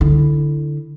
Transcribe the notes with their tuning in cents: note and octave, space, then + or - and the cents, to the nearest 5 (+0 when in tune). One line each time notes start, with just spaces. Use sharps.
D3 +0 E4 +0